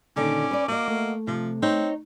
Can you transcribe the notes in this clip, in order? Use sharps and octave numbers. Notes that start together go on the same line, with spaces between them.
A#2 D3 D#3 C#4 D6
B4 D5
A#3 F#4 D#5
A3
C3 F3
C4 D#4 C#5